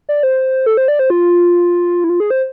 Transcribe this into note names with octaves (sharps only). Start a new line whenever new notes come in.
D5
C5
A4
C5
D5
C5
F4
E4
F4
G#4
C5